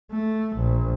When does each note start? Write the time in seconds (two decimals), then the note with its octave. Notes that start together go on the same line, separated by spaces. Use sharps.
0.12 A3
0.57 A#1